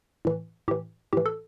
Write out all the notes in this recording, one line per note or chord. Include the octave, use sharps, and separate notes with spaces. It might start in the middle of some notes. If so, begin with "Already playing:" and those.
A2 E3
A2 E3 G4
A2 E3 G4
A4